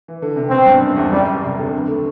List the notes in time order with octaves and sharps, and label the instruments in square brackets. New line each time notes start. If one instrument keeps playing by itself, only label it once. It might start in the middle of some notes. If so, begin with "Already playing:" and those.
[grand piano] E3
D3
C3
[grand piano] B2 [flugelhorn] C4
[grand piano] G2
F#2
E2
[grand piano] F#2 [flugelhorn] G3
[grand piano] F#2
C3
D3
D3
A3